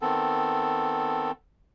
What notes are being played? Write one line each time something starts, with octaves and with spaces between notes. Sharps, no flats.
D#3 B3 C4 A4